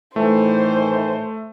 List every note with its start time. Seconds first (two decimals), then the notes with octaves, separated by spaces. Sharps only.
0.16 A2 D#3 E3 A3 C5